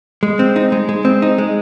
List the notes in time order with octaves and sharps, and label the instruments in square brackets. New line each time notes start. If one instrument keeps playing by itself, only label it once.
[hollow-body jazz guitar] G#3
C4
D#4
G#3
G#3
C4
D#4
G#3